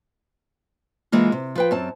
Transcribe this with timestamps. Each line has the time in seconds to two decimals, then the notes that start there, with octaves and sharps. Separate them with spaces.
1.12 E3 G#3 A#3 F4
1.32 C3
1.55 F3 B4 G5
1.71 F#2 C4 A5